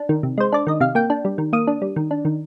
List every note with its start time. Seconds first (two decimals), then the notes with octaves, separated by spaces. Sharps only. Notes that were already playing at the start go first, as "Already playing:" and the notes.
Already playing: D4
0.09 D#3
0.23 C3
0.38 G#3 C5
0.52 D4 D5
0.67 D#3 D#5
0.80 C3 F5
0.95 A#3 G5
1.10 D4
1.25 G3
1.38 D#3
1.53 A#3 D#6
1.67 D4
1.82 G3
1.96 D#3
2.11 D4
2.25 D#3